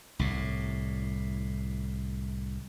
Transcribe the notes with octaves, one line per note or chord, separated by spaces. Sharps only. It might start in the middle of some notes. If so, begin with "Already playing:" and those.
C2 A2